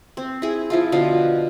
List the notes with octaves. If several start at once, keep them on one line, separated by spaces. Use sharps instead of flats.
C4
E4 G#4
F3 E4 F4
B2 D3 F3 F5